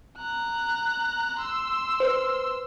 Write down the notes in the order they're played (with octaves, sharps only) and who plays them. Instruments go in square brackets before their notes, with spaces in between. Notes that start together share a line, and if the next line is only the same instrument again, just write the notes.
[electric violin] A#5 F#6
C6 E6
[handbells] B4 C5